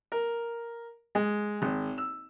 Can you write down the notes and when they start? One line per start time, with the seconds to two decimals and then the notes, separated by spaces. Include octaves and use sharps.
0.12 A#4
1.15 G#3
1.62 G#1
1.98 E6